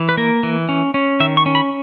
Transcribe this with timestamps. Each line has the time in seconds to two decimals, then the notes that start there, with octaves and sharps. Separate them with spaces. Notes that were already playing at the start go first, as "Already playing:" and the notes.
Already playing: E3
0.09 B4
0.17 A#3 A#4
0.43 E3
0.69 C#4
0.94 C#4
1.20 D#3 E5
1.37 C#6
1.46 C#4
1.55 B5